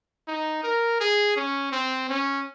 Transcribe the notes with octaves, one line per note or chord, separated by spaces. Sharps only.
D#4
A#4
G#4
C#4
C4
C#4